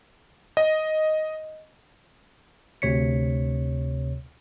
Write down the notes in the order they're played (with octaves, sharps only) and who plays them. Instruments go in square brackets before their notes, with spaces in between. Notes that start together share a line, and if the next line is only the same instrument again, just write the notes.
[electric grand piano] D#5
[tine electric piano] D2 C3 C#5 B6 C#7